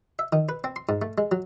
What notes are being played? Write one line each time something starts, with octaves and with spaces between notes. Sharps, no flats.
E5
D#3
B4
C4
C6
G#2
A3
G#3
F#3